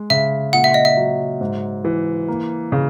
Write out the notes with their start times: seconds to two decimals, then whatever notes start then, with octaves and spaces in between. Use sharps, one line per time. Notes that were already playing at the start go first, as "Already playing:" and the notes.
Already playing: G#3
0.10 C#3 E5
0.53 A#2 F#5
0.64 E5
0.74 D#5
0.85 E5
0.97 F#3
1.41 G#2
1.85 E3
2.28 A#3
2.72 C#3